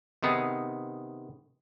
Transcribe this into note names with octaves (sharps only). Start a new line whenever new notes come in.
C3 D#3 B3 D#4 G#4